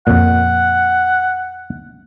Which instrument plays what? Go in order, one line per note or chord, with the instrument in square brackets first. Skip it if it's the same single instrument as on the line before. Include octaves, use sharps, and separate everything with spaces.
[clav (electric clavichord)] F2 A#2 [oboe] F#5